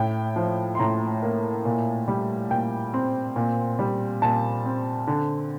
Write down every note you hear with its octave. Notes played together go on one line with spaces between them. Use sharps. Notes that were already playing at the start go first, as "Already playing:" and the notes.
Already playing: A2 G5
F3
C6
A2 A#5
A#3
A#2
G3
A#2 G5
C4
A#2
G3
A#2 A5
C4
D3